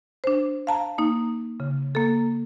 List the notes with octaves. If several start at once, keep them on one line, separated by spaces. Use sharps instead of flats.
D4 C5
F5 A5 A#5
A#3 D#4
C#3
A#3 A4